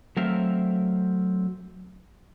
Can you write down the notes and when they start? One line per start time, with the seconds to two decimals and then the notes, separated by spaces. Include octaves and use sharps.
0.17 F#3 A3 C4 A#4 E5 F5